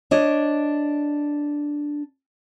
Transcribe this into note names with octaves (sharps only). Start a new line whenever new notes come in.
D4 C#5 D#5